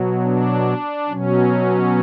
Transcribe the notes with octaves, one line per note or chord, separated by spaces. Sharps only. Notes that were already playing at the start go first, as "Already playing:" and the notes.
Already playing: B2 F#3
D4
B2 F#3 C#4